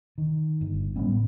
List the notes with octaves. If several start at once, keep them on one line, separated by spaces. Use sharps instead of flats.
D#3
G1
A1 G3 B3 C#4
A2